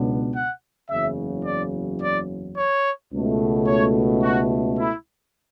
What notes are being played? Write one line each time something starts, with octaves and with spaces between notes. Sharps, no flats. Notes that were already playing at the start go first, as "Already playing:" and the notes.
Already playing: C#2 B2 F#3 B3 D4
F#5
F#1 E2 C#3 F#3 E5
D5
D5
C#5
C#2 B2 A3
C#5
F#4
E4